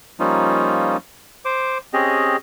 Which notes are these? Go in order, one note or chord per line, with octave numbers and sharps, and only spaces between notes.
F3 G3 A#3 C#4 D#4 F4
C5 D6
C4 C#4 G4 G#4 D#5